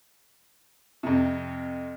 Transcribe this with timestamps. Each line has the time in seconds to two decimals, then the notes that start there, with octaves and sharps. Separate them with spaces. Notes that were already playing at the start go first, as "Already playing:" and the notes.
1.03 F2 C3